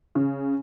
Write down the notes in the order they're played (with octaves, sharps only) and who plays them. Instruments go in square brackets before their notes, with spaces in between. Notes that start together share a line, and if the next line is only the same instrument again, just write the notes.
[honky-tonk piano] C#3